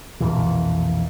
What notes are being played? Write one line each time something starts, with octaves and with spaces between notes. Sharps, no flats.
B1 F2 A#2 E3